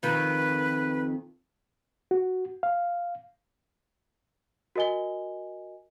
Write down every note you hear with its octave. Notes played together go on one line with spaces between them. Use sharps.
F2 D#3 B4
F#4
F5
F#4 A#4 D#5 G#5 G7